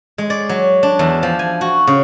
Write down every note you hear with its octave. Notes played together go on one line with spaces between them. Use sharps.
G#3
D5
F#3
D4
E2
F3
G#5
F#4
C#3